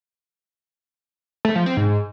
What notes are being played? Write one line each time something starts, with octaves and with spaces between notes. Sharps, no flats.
A3
F3
C4
G#2